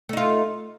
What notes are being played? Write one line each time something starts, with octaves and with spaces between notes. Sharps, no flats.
A3 D#4 F4